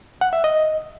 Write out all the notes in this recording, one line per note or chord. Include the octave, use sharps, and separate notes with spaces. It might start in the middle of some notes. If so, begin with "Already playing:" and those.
F#5
E5
D#5